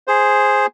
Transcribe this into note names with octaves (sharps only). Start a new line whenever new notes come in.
G#4 C5